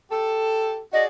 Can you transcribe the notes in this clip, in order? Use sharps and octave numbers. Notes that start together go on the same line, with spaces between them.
G4 A4
F#4 G#4 D5 D#5